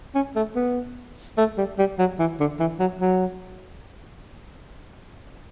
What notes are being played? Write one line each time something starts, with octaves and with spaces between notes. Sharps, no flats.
C#4
A3
B3
A3
G3
G3
F#3
E3
D3
E3
F#3
F#3